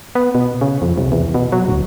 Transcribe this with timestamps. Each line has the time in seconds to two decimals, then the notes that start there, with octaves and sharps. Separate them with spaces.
0.15 B3
0.35 B2
0.61 C#3
0.82 F2
0.98 C2
1.12 E2
1.34 B2
1.52 F#3
1.68 D1